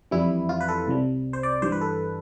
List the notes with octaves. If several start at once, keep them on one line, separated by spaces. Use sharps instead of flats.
F2 E3 G3 E4
F4
B4
A4
C2 C3 G3
C5
D5
G2 E3 G3 C5
B4
A4